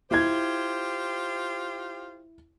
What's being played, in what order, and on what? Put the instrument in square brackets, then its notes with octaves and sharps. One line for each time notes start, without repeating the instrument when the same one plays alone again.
[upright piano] E4 G#6 [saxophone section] F4 G4 C5